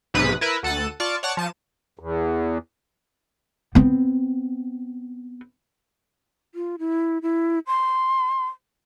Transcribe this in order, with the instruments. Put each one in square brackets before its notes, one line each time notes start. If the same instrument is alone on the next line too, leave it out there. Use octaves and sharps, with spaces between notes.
[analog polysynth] B1 G#2 C3 B4 D#6
E4 A#4 B4
D2 A4 F#5 A5 D#7
F4 D5 A5 C#6
C#5 D5 F#5 A5 C#6
F3 A5 D#7
[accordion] E2
[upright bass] B3 C4
[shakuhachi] F4
E4
E4
C6